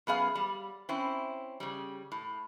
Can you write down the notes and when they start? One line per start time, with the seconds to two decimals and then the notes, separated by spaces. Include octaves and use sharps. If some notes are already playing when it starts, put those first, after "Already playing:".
0.07 F#2 B3 G#4 F5
0.35 G3
0.89 C4 C#4 E4
1.60 C#3 G3
2.12 A2